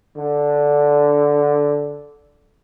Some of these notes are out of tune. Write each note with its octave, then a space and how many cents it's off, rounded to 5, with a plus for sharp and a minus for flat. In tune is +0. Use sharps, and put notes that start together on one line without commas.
D3 -10